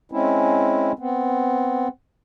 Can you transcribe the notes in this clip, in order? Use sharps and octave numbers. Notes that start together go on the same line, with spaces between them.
G#3 C4 C#4 E4
B3 C4